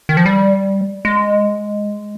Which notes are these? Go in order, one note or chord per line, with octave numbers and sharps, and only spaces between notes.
D#3
F3
G3
G#3